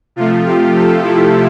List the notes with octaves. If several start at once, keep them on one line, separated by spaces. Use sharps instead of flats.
C3 F3 A3 F4
G4
A4
E4